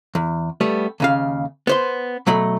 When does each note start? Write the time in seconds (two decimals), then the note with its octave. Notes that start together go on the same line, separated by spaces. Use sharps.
0.15 E2
0.61 G3 A3 B3
1.00 D#2 C#3 F5
1.67 B3 C5 C6
2.27 B2 F#3 A3 B5